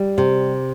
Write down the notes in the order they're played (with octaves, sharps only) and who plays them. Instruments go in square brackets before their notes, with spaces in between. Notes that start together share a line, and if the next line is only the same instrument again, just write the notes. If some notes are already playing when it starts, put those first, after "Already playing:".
Already playing: [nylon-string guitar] G3
C3